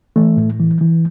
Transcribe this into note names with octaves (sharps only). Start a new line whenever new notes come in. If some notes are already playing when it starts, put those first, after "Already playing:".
E3 A3
A2
E3
E3